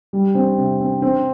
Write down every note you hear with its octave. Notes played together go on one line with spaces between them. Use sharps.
G3
C4
C3
C4
C4